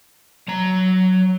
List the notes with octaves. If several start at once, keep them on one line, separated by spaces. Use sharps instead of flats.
F#3 A#5